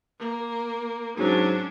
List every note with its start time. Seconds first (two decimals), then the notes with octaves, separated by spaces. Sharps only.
0.19 A#3
1.17 G#2 F#3 C#4 D4